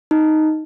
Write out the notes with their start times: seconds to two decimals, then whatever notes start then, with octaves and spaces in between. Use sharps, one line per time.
0.11 D#4